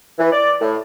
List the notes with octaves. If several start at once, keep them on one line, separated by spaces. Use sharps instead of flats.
E3
D5
A2